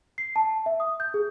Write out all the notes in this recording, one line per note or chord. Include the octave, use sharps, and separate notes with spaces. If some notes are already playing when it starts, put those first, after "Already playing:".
C7
A5
E5
D#6
G6
G#4